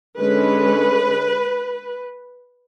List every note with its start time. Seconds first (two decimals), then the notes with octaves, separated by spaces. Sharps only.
0.18 D3 G#3 C#4 B4